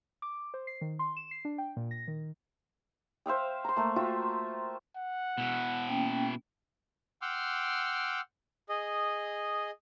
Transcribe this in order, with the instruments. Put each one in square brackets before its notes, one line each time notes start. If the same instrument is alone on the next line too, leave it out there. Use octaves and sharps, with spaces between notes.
[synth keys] D6
C5
C7
D#3
C6
E7
C7
D4
G5
A#2
A#6
D#3
[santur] C5 E5 F5 G5
A#5 C6
A3 A#3
F4 F#4 E5 G5
[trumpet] F#5
[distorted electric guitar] B2 E4
[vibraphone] A#3 C#4 G5
[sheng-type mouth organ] F#5 G5 C6 D6 E6 F6
G#4 D#5